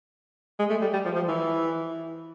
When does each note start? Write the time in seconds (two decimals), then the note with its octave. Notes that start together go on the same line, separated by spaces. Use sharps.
0.59 G#3
0.70 A3
0.81 G3
0.93 G3
1.05 F3
1.16 F3
1.28 E3